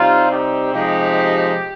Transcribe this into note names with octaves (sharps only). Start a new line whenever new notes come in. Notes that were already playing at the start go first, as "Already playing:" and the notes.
Already playing: C3 G3 C4 D#4 F4
D#4 G4
C3 F3 G#3 D#4 G4